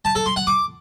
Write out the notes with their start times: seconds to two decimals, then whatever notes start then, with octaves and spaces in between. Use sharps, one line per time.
0.05 A5
0.15 A4
0.26 C6
0.36 F#5
0.47 D6